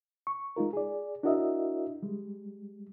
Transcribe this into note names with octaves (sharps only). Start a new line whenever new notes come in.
C#6
G#3 D#4 F4 A#4
G#4 D5
D4 E4 F#4 A#4 D#5 E5
G3 G#3